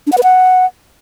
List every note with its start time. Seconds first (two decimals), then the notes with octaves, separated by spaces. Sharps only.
0.07 D4
0.12 F#5
0.18 B4
0.23 F#5